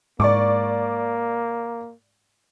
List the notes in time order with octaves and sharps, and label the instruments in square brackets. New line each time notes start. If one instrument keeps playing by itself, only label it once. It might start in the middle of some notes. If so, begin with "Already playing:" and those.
[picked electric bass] G#2 [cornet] A#3 [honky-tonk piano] D5 C#6 D6